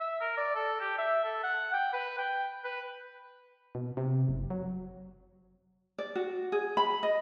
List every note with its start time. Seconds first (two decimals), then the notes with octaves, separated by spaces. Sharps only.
0.01 E5
0.21 A#4
0.37 D5
0.55 A4
0.81 G4
0.98 E5
1.24 A4
1.43 F#5
1.74 G5
1.93 B4
2.18 G5
2.64 B4
3.75 B2
3.97 C3
4.29 F#1
4.50 F#3
5.98 D5
6.15 F#4
6.52 G#4
6.77 B5
7.03 D#5